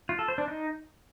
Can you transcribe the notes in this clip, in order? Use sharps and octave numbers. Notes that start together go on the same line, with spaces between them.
F4
A4
C5
D4
D#4